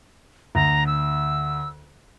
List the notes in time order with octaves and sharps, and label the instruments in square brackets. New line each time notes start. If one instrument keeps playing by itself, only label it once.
[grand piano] D2 [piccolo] A#5
[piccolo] E6